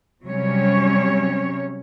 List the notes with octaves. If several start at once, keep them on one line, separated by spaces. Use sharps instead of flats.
C3 F#3 G3 C#4 C#5